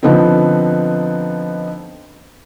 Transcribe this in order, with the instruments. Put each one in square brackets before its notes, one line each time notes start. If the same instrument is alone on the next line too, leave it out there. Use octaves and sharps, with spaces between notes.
[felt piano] D3 F3 B3 C4 D#4